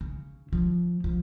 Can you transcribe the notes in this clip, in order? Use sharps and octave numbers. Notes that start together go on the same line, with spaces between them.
C#3
F3
F3